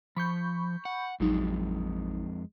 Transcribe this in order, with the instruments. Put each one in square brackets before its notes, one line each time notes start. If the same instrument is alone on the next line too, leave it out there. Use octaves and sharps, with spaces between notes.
[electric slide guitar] F3 [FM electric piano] B5 C#6 G6
[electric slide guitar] F#5
[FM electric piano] A1 F#3 D#4 [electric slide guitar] F2 G#3